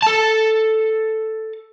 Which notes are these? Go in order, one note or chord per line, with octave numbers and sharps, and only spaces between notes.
A4 A5